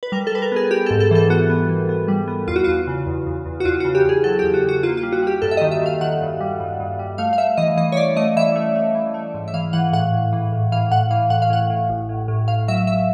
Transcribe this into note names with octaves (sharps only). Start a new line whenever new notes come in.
B4
G3 A#4
A4
G3 B4
A#4
B3 G#4
B3 G4
G#2 A4
A4
E3 A4
B3 F#4
B3
E3
B3
G3
B3
E2 F4
F#4
E2 F4
C#3
E2
E2
E2
F#4
E2 F4
C#3 F#4
G4
E2 G#4
F#3 A4
E2 G4
F#4
E2
F#4
A#3 F4
F4
G3
F#4
G3 G4
G2 A4
E5
D#3 D#5
E5
D#3 F5
D#3 F#5
G2
G3
G2
G2
G3
A3 F5
F5
A3 E5
E3 D#5
E3 D#5
C#5
C#4 D5
A3 D#5
E3 E5
A3
A3
E3
A3
G#2
E5
E3 F5
E3 F#5
A2 F#5
A2
E3
A2
E3 F5
A2 F#5
E3 F5
A2 F#5
F5
A2 F#5
A2
A1
A2
A2
A2 F5
F#3 E5
F#3 E5